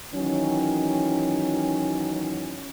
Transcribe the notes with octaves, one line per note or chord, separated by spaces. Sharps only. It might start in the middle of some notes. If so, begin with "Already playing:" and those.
D#3 E3 F#3 C#4